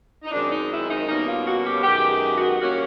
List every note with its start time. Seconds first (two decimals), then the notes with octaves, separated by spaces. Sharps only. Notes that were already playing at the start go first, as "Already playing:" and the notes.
0.23 D#4
0.31 F#2 D#3 G#3 C4 D4
0.51 D#4
0.70 E4
0.88 D#4
1.07 B2 G3 A#3 C#4 D#4
1.26 F4
1.45 F#4
1.64 G4
1.83 F#2 D#3 G#3 B3 G4
2.09 G4
2.34 F#4
2.60 A#2 G3 A#3 C#4 F#4